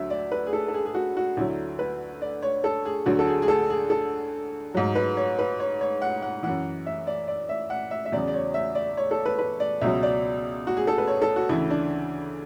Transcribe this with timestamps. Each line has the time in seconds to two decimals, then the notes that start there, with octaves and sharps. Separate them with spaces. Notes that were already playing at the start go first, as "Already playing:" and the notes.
Already playing: D2 D3 F#3 E5
0.10 D5
0.32 B4
0.46 G#4
0.53 A4
0.68 A4
0.74 G#4
0.85 G#4
0.94 F#4
1.17 F#4
1.37 D2 D3 F#3 E4
1.79 B4
2.22 D5
2.43 C#5
2.64 A4
2.85 G#4
3.06 D2 D3 F#3 F#4
3.19 A4
3.27 G#4
3.42 G#4
3.48 A4
3.70 G#4
3.90 A4
4.74 G#2 F#3
4.95 B4
5.17 C#5
5.39 B4
5.60 C#5
5.81 C#5
6.02 F#5
6.22 F#5
6.43 F#2 E3 F#5
6.86 E5
7.07 D5
7.28 D5
7.49 E5
7.70 F#5
7.91 E5
8.05 E5
8.12 E2 C#3 F#3 D5
8.28 D5
8.34 C#5
8.54 E5
8.75 D5
8.97 C#5
9.11 A4
9.26 B4
9.39 B4
9.60 D5
9.81 C#2 B2 F#3 E5
10.03 D5
10.67 F#4
10.77 G#4
10.87 A4
10.98 B4
11.07 C#5
11.22 A4
11.36 F#4
11.49 D2 C#3 E3 E4
11.70 D4